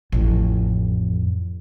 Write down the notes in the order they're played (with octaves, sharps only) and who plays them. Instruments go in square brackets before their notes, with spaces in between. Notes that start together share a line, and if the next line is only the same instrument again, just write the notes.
[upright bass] A1 F2